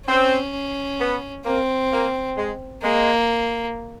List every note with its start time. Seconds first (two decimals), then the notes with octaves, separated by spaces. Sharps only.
0.08 C4 C#4
1.00 B3
1.45 A#3 C4
1.91 A#3
2.37 G#3
2.83 G#3 A#3